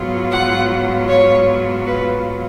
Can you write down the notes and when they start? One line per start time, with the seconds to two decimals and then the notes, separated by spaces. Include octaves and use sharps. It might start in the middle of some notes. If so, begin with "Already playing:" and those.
Already playing: G#2 F#3 B3 F4
0.31 F#5
1.08 C#5
1.86 B4